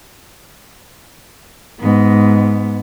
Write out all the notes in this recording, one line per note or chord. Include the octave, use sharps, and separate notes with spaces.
G#2 B3